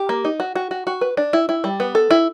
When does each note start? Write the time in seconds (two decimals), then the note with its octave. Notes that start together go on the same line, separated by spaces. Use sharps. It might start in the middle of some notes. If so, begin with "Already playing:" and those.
Already playing: G4
0.09 A#3
0.25 D#4
0.40 F#4
0.55 F#4
0.71 F#4
0.87 F#4
1.01 B4
1.17 D4
1.33 E4
1.49 E4
1.64 G3
1.80 B3
1.95 A4
2.11 E4